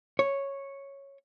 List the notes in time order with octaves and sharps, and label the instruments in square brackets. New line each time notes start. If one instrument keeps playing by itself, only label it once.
[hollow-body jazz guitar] C#5